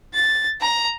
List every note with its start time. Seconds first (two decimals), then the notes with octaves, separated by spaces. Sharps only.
0.14 A6
0.61 A#5